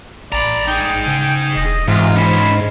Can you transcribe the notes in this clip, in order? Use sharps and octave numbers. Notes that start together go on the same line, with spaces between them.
A1 D5 A#5 B5
D#4 G#4 G5
C#3
E1 D#5
G#2 C3 E3 F4
C#4 C5 B5